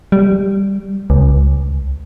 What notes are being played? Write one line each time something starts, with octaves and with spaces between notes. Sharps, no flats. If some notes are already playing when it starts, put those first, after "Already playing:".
G3
C#2